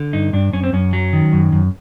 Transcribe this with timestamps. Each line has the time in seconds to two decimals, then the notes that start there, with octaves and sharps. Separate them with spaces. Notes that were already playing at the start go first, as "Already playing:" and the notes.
Already playing: D3
0.13 G2 D#4
0.33 G2 D4
0.53 F#2 C#4
0.64 C4
0.73 F#2 C#4
0.93 F#3
1.13 D#3
1.33 F#2
1.52 F#2